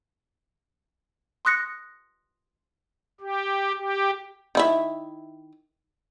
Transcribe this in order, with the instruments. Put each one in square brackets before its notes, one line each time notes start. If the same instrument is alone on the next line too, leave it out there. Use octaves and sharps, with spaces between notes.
[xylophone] C6 D#6 F#6 A#6 C#7
[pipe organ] G4
G4
[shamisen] D#3 E4 E5